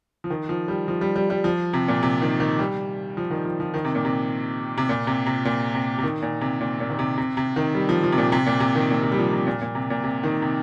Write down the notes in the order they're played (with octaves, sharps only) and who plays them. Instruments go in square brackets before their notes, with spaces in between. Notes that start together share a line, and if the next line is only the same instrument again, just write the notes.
[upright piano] F3
D#3
F3
G3
F3
G3
G3
G3
F3
C3
A#2
C3
D#3
D#3
G3
F3
D#3
F3
F3
D#3
C3
A#2
C3
C3
A#2
C3
C3
A#2
C3
C3
D#3
A#2
C3
A#2
A#2
D#3
C3
C3
C3
D#3
G3
F3
F3
C3
A#2
C3
A#2
C3
D#3
A#2
C3
G3
F3
C3
A#2
A#2
C3
A#2
C3
D#3
C3